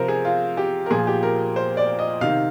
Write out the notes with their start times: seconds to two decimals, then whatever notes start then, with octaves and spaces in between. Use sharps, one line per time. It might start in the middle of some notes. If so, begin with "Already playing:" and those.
Already playing: C3 F3 A#4 C5
0.08 G#4
0.25 F4
0.57 G4
0.86 A#4
0.90 A#2 F3 G#4
1.07 G4
1.23 A#4
1.56 C5
1.77 D5
1.99 D#5
2.21 C3 D#3 F5